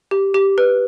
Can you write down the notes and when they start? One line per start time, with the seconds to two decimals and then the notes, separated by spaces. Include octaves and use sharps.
0.11 G4
0.34 G4
0.58 B4